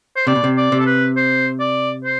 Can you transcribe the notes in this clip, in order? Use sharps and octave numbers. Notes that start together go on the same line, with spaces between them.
C5
C3 D5
B2
C3
D5
C3
A4
B4
C5
D5
C5